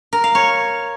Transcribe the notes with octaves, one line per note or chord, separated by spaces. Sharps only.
A#4
F5
C#5